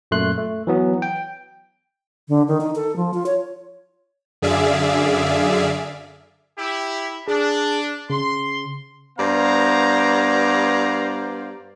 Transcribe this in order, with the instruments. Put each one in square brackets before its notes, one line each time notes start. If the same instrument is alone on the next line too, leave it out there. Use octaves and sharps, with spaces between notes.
[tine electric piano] F#2 A#2 A3 C6 F#6
A3
E3 F#3 B3
G5
[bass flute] D3
D#3
D#4
A4
F3
F4
C#5
[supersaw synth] F#2 D3 G#4 D5 E5 F5
[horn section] E4 G4
[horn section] D4 [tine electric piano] G#4
[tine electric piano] C#3 [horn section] C6
[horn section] G2 B3 C5 D5 F5 A#5